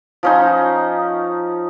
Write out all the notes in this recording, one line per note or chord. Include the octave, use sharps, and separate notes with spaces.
F3 C#4 D#4